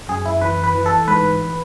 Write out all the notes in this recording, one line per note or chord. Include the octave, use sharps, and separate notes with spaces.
F#2 G#4
E4
E3 B4
B4
E3
A4
G#2 B4